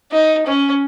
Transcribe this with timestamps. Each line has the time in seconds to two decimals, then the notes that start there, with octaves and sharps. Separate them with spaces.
0.12 D#4
0.46 C#4